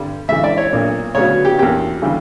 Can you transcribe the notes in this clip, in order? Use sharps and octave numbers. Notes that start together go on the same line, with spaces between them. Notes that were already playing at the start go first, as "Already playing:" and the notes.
Already playing: G2 D3 G3
C#2 C#3 E3 E5
D5
C#5
B1 A#2 A#3 D4
D2 C#3 F#3 B3 D4 C#5
G4
E2 B2 A#3 C#4 G4
C#3 E3 G3 B3